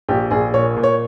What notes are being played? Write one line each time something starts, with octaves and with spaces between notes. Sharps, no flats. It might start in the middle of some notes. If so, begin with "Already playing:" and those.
A#1 G4
A#1 G#4
A#2 C#5
A#2
C#5